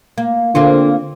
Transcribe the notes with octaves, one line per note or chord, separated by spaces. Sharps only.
A#3
D3 A#3 C4 F4